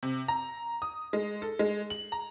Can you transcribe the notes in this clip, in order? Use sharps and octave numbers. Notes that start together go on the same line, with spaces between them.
C3
A#5
D#6
G#3
A4
G#3
F#7
A#5